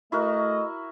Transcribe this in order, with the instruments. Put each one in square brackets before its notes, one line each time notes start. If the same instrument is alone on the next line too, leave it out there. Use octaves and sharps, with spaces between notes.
[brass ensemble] A3 D#5 [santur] E4 F#4 A#4